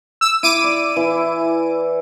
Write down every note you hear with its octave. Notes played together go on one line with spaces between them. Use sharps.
E6
E4 D6 D7 D#7
D5
E3